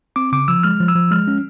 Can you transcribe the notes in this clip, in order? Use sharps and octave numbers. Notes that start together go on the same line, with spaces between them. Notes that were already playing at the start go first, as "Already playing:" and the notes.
C4 D6
C#3 D6
F3 E6
G#3 F6
F3
E6
F3
G#3 F6
C#4